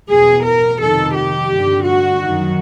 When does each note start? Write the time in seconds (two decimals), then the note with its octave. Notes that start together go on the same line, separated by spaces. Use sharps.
0.10 E2 B2 G#4
0.45 A#4
0.81 F2 C3 D#3 A4
1.15 G4
1.51 G2 D3
1.85 F#4
2.20 F#2 D#3